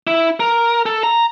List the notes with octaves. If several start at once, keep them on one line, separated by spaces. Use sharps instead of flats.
E4
A#4
A4
A#5